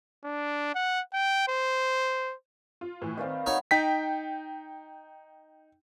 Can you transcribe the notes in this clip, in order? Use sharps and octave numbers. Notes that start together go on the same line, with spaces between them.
D4
F#5
G5
C5
F4
A2 E3
D#3 C4 B4 D5 F5
D#4 F#4 C#5 F#5 B5
D#4 G5 B6